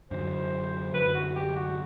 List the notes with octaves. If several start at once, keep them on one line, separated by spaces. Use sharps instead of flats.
F#2 D3 F#3 C5
F#2 D3 F#3 B4
F#4
G4
F#4